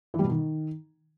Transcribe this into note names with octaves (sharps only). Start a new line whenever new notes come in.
E3
G3
B2
D#3